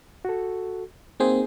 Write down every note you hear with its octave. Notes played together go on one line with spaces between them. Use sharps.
F#4 A4
A#3 C4 D#4 G#4 C5